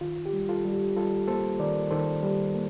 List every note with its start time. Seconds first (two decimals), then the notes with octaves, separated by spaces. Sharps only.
0.01 D#3 F4
0.26 G4
0.33 G3
0.49 F4 A4
0.65 G3
0.73 G4
0.96 G3 F4 A4
1.27 A#3 A4 C5
1.60 D#3 A#4 D5
1.91 D#3 A4 C5
2.23 G3
2.54 A#3